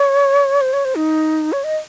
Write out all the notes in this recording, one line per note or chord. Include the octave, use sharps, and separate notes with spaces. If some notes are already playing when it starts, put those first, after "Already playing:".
Already playing: C#5
C5
C#5
C5
D#4
C#5
D#5